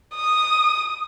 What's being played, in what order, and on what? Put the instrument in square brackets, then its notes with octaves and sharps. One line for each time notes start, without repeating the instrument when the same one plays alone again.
[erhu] D#6